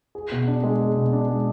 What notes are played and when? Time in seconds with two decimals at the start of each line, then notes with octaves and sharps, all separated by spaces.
0.15 G#4
0.32 B2
0.48 D4
0.63 G#3
0.80 G#4
0.96 B2
1.13 D4
1.28 G#3